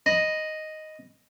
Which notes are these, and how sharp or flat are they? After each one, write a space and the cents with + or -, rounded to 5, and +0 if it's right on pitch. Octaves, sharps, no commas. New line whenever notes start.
D#5 +0 B5 +0